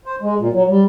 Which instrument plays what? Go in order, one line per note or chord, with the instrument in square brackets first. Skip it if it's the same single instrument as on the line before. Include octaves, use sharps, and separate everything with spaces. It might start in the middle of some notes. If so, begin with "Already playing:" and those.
[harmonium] C5
G#3
A#2
F#3
G3